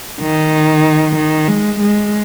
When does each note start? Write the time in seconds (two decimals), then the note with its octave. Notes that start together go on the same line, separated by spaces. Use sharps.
0.22 D#3
1.17 D#3
1.48 G#3
1.80 G#3